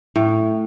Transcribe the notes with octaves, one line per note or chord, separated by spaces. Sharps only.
A2